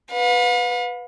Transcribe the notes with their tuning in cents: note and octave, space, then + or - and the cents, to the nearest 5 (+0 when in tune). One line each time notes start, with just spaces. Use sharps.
B4 +0 F5 +45